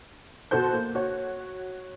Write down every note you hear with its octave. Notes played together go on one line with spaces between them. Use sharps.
B2 F#4 A4 C5 G6
A#3
F#4 C#5